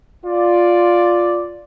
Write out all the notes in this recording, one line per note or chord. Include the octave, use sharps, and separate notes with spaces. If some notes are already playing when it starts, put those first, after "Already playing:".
F4 D5